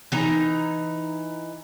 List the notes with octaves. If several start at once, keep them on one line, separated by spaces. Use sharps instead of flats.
E3 D#4 A#5